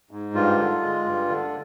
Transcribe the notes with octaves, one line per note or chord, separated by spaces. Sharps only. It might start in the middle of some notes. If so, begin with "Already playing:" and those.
G#2
G2 F4
D3
G#3
G2
D3